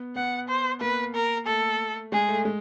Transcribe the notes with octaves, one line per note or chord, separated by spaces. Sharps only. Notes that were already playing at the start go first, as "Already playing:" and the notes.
Already playing: B3
B3 F#5
C5
A#3 B4
A#4
A3 A4
G#3 G#4
A3
G#3